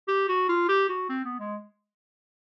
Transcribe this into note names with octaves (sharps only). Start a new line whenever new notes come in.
G4
F#4
F4
G4
F#4
C4
B3
G#3